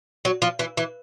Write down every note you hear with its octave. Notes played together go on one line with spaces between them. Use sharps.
F#3
F3
E3
E3